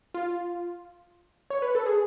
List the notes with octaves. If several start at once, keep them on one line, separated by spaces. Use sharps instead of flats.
F4
C#5
B4
A4
G#4